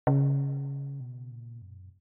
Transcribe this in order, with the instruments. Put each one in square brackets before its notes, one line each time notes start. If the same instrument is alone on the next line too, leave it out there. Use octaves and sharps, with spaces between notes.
[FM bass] C#3
B2
A#2
F#2